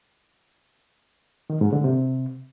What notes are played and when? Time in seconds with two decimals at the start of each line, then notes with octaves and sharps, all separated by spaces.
1.50 D#3
1.61 G#2
1.73 D3
1.84 C3